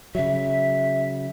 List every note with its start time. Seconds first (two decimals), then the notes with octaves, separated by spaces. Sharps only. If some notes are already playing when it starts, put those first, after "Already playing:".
0.15 C#3 F#3 E5